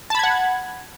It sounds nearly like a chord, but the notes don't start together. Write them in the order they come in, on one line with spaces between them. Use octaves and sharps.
A5 B5 G#6 F#5